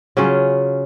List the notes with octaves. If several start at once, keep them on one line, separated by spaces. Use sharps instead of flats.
C#3 F#3 C#4 F4